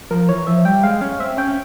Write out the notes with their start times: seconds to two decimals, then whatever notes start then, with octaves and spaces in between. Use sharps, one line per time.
0.10 F3 A#4
0.29 E3 C#5
0.47 F3 E5
0.65 G3 G5
0.84 G#3 F5
1.01 C#4 F5
1.19 C4 E5
1.37 C#4 G5